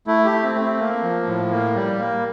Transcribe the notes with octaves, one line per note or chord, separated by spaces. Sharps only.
A3 E4
G4
A3
C4
A3
C4
A#3
F3
A2
A#3
G3
A#3